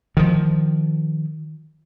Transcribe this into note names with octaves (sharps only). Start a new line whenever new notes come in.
D#3 F3